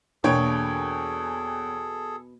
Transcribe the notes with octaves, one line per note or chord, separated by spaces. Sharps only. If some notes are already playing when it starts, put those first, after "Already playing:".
E2 B2 A#3 D4 G#4 A4 C#5 G5